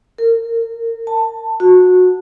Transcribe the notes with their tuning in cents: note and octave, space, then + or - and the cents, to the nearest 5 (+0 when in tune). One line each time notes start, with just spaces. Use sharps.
A#4 -25
A5 +15
F#4 -20